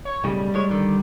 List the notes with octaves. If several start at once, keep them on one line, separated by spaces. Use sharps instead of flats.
C#5
B1 A2 C#3 G3
A2 G#3 C#5
D3 D#3